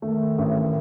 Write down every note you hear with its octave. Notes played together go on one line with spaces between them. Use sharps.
D#3 A3
A1